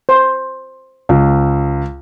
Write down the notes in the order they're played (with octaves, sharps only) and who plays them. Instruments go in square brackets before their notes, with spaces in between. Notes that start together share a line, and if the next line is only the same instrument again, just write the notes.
[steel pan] C5
[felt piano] C#2